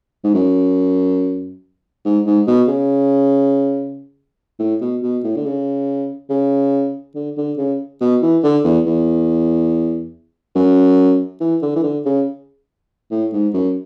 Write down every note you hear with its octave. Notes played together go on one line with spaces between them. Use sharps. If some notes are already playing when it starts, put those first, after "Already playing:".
G#2
F#2
G#2
G#2
B2
C#3
A2
B2
B2
A2
D3
C#3
C#3
D3
D3
C#3
B2
E3
D3
E2
E2
F#2
E3
D3
E3
D3
C#3
A2
G#2
F#2